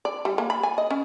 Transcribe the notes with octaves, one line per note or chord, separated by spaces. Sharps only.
D5
G3
A#3
B5
G#5
D#5
C#4